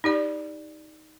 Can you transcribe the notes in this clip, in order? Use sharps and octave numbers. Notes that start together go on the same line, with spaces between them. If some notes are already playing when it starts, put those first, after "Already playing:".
D#4 G4 D5